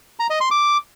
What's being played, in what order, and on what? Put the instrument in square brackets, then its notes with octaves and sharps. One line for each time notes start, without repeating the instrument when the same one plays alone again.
[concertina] A#5
D#5
C6
D6